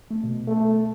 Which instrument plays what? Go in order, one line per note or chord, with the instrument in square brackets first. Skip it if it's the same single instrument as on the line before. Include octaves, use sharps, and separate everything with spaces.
[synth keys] A3
B2
B2
[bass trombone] A3